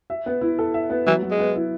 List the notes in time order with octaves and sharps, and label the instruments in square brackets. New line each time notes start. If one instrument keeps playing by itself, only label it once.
[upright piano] E5
B3
E4
A4
E5
B3
[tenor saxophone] E3 [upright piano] F#3
[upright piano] F#3
[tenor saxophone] G#3
[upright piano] B3
E4